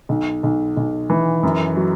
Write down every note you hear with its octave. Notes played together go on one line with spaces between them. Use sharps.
B1
B1
B1
E3
F#2
F#3